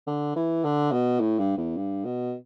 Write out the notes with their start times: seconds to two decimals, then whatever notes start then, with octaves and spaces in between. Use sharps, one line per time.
0.07 D3
0.36 E3
0.64 D3
0.92 B2
1.20 A2
1.39 G2
1.57 E2
1.76 G2
2.05 B2